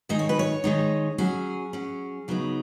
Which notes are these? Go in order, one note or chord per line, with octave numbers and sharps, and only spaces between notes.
D#3 G#3 D#4 D#5
C#5
B4
C#5
D#3 G#3 D#4
F#3 C#4 G#4
F#3 C#4
C#3 F#3 B3 D#4